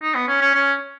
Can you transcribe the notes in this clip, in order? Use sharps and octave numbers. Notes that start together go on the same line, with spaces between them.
D#4
B3
C#4
C#4
C#4